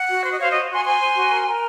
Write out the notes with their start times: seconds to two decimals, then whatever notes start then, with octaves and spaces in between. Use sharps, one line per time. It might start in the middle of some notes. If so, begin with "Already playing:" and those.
Already playing: F#5
0.09 F#4
0.24 C5
0.32 D#5
0.39 C5 C#5 F5
0.52 F#4 D#5
0.70 F#4 G#5 C6
0.85 C5 G#5 C6
1.01 C5
1.16 F#4
1.31 A#4
1.47 A#4